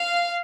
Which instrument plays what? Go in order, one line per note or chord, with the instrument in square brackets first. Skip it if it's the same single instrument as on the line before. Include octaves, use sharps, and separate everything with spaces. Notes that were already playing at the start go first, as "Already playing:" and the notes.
Already playing: [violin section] F5